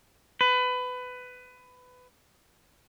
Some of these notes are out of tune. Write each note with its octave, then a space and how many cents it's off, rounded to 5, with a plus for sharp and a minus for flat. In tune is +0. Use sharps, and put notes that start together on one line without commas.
B4 +20